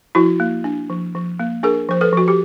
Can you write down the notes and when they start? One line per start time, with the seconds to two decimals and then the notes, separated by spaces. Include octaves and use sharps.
0.15 F3 E4 F#4
0.40 A#3
0.64 D4
0.90 F3
1.15 F3
1.40 A#3
1.63 D4 G#4 A#4
1.89 F3 C5
2.01 A4 B4
2.13 F3 F#4
2.28 G4